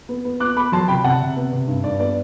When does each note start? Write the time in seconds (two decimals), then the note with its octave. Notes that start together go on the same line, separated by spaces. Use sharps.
0.09 B3
0.25 B3
0.40 B3 D6 F#6
0.56 B3 B5 D6
0.72 F#3 A5 C6
0.88 C3 G5 B5
1.04 C3 F#5 A5
1.21 C3
1.36 B3
1.52 C3
1.68 G2
1.84 G2 D5
1.99 B3 D5